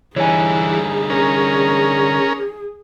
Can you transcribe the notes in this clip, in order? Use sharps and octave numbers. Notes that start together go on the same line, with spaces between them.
D3 E3 G3 D#4 G#4 C#5 G#5
C#4 A#4